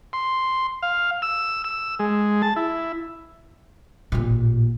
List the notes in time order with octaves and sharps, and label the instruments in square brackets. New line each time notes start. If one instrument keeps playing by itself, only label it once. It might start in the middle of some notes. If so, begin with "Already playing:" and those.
[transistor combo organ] C6
F5
E6
E6
G#3
A5
E4
[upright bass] A1 A#2